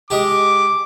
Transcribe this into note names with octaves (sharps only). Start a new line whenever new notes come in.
G#3 G4 D6